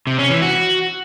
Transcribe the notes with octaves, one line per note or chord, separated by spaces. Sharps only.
C3
C#4
E3
F#4